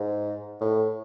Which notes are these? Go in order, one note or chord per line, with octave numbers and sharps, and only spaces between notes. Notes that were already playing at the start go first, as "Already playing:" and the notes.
Already playing: G#2
A2